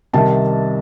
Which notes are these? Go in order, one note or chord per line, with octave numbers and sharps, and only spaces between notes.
C2 C3 D#3 G3 A5